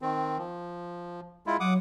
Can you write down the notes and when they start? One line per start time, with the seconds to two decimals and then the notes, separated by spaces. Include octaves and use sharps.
0.02 D#3 C4
0.38 F3
1.47 G#3 E4 F4
1.60 F#3 F#5 D6 D#6